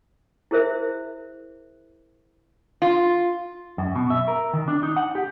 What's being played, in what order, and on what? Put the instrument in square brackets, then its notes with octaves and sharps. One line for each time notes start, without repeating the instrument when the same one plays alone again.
[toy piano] E4 G#4 A#4 C5 E5
[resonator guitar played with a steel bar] F4
[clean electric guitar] F#2
B2
E5
A#4
D#3
D4
D#4
F#5
G4